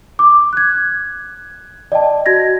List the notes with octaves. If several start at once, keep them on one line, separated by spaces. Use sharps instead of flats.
D6
F#6 G#6
D5 D#5 G5 A5
F#4 G#6 A#6